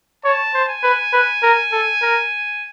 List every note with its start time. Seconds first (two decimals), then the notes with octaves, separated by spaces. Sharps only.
0.24 C#5 A5
0.54 C5
0.69 G#5
0.83 B4
1.13 B4
1.43 A#4
1.72 A4
2.02 A#4